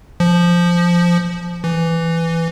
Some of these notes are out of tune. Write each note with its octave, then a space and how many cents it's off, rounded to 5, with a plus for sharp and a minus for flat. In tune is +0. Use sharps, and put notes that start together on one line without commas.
F3 -5
E3 +10